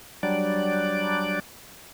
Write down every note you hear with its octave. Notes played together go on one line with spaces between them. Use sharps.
F#3 G3 D4 D5